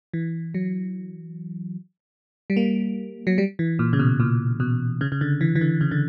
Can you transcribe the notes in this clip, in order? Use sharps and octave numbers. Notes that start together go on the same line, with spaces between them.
E3
F#3
G3
A#3
F#3
G3
E3
A#2
C#3
B2
A#2
B2
C#3
C#3
D3
E3
E3
D3
C#3
D3